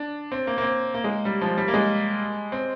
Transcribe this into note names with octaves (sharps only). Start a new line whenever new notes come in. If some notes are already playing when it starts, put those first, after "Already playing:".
Already playing: D4
C4
A#3
A#3
C4
A#3
G#3
G3
F3
G3
A#3
G#3
C4